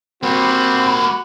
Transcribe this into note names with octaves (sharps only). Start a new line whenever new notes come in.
G3 A#3 C4 F#4 B5